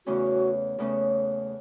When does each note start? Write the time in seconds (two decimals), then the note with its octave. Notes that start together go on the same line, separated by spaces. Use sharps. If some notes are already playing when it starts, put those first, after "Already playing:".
0.06 E2 C#3 E3 A3 C#4 F#4
0.78 E2 C#3 E3 A3 C#4